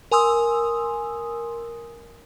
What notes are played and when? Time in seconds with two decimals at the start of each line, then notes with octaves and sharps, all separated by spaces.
0.11 A#4 G#5 C6 D#6 E6